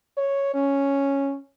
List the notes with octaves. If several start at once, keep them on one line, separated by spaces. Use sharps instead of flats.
C#5
C#4